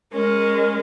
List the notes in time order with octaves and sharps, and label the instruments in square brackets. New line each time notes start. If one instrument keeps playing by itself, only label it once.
[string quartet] G#3 C#4 [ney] A#4